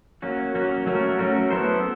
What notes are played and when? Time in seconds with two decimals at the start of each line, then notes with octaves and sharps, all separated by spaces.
0.22 F#3 A#3 C#4 F#4
0.55 F#3 A#3 C#4 F#4
0.86 F#3 A3 C#4 F#4 A#4
1.19 F#3 A3 C#4 F#4 A#4
1.50 B3 E4 A4 C5